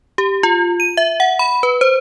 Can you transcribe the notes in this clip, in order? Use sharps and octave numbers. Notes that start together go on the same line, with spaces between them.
G4
F4
D#7
E5
F#5
B5
B4
C5